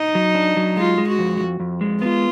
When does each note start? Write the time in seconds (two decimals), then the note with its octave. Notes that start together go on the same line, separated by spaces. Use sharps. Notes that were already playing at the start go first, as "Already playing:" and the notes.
Already playing: D#4
0.15 F#3
0.35 D4
0.57 F#3
0.77 G#3 F4
0.98 G#3
1.08 F#4
1.19 F2
1.40 F2
1.60 F2
1.81 G#3
2.02 B3 F4